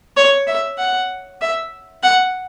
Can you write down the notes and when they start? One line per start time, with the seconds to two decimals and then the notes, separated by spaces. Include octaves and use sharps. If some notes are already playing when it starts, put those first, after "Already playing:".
0.17 C#5
0.47 E5
0.78 F#5
1.41 E5
2.03 F#5